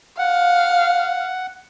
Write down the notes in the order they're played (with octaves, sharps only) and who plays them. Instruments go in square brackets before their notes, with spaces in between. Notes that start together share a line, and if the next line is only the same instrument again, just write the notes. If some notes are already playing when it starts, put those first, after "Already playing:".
[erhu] F5 [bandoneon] F#5